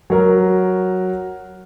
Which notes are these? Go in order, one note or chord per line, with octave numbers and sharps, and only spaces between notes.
F#3 A#4